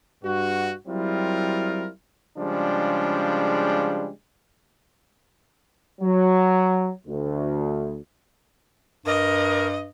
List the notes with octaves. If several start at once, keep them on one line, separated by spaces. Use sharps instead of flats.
G2 F#4
F#3 G3 C4 E4 F4 A#4
C#3 F3 G3 G#3 D4
F#3
D2
G2 A#4 D#5